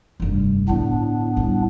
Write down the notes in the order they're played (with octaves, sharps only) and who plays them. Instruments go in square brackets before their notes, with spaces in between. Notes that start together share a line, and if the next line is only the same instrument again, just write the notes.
[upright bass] F1 G2
[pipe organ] A2 B3 D4 [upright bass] D3
[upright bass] G3 E4